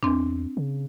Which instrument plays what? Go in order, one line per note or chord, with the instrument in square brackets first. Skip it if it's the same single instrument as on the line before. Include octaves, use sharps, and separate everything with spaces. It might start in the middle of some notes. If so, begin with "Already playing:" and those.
[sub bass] E2 [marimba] C4 D4
[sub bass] C#3